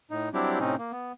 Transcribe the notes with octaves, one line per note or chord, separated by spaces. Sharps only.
A2 D#4
F#3 G3 C4 D4 E4 G4
A2 C3 C4 C#4 D#4
A#3
B3